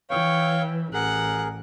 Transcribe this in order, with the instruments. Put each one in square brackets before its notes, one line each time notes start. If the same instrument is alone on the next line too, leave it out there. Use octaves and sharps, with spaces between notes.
[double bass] E3 [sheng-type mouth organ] C#5 F5 C#6 [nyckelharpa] G5
[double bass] A1 [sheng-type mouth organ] G#4 A#4 [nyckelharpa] F#5